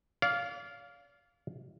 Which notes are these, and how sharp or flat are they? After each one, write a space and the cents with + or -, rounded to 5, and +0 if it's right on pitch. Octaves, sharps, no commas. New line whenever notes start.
D5 -35 F5 +0